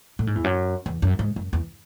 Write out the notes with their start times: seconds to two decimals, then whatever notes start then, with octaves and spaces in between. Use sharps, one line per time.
0.19 A2
0.27 G#2
0.35 E2
0.44 F#2
0.86 E2
1.02 F#2
1.19 G#2
1.36 F#2
1.53 E2